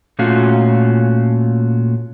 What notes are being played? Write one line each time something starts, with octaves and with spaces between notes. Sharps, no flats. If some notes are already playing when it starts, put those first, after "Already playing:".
A#2 A3 C#4 F4 F#4